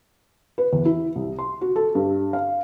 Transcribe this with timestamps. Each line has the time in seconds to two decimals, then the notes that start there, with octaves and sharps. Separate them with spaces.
0.58 B4
0.73 E2
0.85 E4
1.16 C2
1.39 C6
1.61 F#4
1.76 A4
1.95 G2
2.33 F5